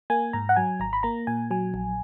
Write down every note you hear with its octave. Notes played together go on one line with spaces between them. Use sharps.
A#3 G#5
G#2 A#5
F#5
F#3 G#5
G#1 A#5
B5
A#3 A#5
A#2 G#5
F#3 G#5
A#1